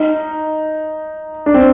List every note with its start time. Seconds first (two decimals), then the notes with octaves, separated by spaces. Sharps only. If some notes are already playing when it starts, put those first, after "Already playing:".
Already playing: D#4
1.46 D4
1.54 C4